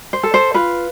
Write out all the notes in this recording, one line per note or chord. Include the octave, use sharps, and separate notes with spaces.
C5
A4
C5
F4 B4